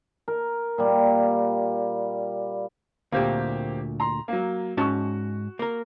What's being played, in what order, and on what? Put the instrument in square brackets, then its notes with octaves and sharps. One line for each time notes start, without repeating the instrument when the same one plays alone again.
[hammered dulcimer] A#4
A#2 G3
[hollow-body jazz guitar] D2 A#2 [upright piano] A#3 C4 G4
[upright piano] A#5 C6
F#3 A#3
[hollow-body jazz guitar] G#2 C#4 A5 [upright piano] F#4 C#6
[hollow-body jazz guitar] A#3 A#4